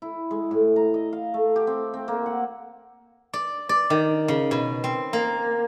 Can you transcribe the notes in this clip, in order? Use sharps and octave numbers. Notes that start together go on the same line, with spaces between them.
E4
G#3
A2
A#5
D#5
F5
A3
G4
C4
C4
A#3
F#5
D5
D5
D#3
C#3
B2
C4
A#3